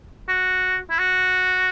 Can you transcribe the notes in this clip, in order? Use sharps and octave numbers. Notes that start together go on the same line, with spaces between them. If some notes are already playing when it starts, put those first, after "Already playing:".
F#4
E4
F#4